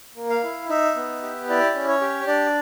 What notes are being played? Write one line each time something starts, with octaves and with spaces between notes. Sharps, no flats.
A#3
F5
E4
D#4 E5
B3
G4
E4 D5
C#4
C#5
G4
D4 D5